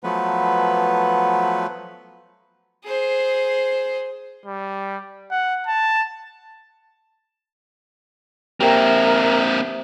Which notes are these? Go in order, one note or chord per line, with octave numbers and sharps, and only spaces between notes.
F3 F#3 A3 B3 B4
G#4 C5
G3
F#5
A5
A#3 C4 G4 A#4 E5